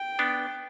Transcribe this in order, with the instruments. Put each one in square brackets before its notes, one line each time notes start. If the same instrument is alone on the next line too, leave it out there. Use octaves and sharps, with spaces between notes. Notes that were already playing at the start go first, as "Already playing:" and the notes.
Already playing: [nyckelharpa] G5
[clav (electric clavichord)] B3 D4